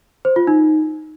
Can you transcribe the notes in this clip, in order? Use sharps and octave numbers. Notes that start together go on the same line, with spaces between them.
C5
F4
D#4